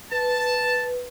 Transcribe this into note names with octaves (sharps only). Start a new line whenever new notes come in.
B4 A5